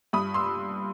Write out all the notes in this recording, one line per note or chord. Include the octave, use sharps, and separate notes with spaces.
G2 B5 D#6
C6 E6